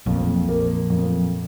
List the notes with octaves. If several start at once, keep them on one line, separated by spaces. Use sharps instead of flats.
A#1 F2 A#2
A#3
F2